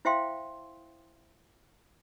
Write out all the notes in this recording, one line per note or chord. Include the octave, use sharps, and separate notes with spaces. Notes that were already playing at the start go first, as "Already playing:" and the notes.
E4 C5 E5 F5 G5 C6